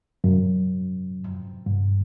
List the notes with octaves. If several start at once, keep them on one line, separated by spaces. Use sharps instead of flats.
F#2
G2